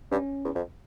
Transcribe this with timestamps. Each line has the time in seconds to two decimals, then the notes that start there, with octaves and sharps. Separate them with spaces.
0.12 G2 C#4
0.45 E2
0.55 F2